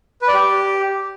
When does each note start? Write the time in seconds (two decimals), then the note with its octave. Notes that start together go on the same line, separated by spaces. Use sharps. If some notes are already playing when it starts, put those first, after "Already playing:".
0.22 B4
0.28 D5
0.34 G4